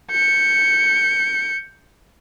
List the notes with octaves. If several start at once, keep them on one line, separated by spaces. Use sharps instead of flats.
G6 C#7